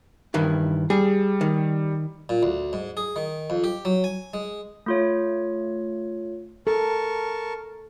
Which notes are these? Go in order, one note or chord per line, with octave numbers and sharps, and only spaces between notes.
G2 D#3 E3
G3 G#4
D#3
A#2
D2
G#2
G#4
D#3
F2
G4
F#3
G#5
G#3
A3 F4 C#5
A4 A#4 A5 C#6